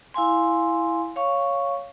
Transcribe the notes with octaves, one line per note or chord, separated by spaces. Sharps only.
E4 F5 G#5 C6
C#5 F5 C#6